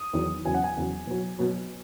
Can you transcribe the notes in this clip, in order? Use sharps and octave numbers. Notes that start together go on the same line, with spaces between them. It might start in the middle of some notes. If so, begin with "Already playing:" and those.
Already playing: D#6
E2 D#3 F#3
E2 C#3 F#3 G#5
F#5
G#5
E2 C#3 F#3
B2 F#3
B2 F#3